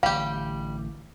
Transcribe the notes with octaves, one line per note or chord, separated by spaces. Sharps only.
A1 D3 G3 G4 F5